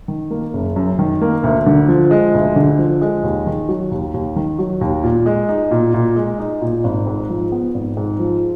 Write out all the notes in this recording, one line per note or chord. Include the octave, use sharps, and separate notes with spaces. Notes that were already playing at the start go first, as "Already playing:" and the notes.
D#3
A#3
F#1
F#2
D#3
A#3
D2
D3
F3
G#3
D2
D3
F3
G#3
D#2
D#3
F#3
D#2
D#2
D#3
F#3
D#2
A#2
G#3
D#4
A#2
A#2
G#3
D#4
A#2
G#1
G#2
F3
B3
G#1
G#2
F3